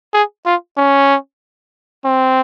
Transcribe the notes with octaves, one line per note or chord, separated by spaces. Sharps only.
G#4
F4
C#4
C4